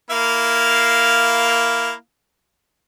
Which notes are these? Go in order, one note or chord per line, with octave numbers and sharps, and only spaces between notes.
A#3 E4 F5